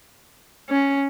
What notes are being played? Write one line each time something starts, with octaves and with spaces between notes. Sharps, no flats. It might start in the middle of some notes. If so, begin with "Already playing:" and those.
C#4